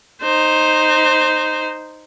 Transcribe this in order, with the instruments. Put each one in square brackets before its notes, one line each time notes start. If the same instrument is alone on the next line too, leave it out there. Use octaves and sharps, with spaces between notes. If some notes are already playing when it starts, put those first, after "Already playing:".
[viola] D#4 C5